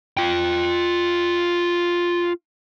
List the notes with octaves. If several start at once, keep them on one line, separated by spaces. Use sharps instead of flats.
F4 G5